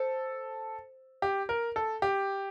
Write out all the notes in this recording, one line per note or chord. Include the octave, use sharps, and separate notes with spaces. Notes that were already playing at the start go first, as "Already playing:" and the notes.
Already playing: A4 C5
G4
A#4
A4
G4